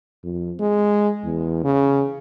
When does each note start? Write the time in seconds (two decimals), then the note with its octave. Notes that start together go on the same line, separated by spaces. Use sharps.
0.24 F2
0.60 G#3
1.24 E2
1.64 C#3